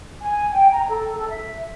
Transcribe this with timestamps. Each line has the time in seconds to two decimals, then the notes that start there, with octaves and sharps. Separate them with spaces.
0.20 G#5
0.52 G5
0.73 A#5
0.89 A4
1.16 A4
1.29 E5